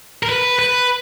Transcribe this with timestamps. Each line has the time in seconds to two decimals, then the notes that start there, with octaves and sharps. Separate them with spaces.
0.23 A#4
0.29 B4
0.59 B4